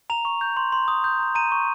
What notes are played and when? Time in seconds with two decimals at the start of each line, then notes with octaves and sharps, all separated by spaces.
0.10 A#5 F7
0.25 C#6
0.41 G6
0.57 C6
0.72 C6
0.88 D#6
1.04 G6
1.19 A#5
1.35 A#5 D#7
1.52 C#6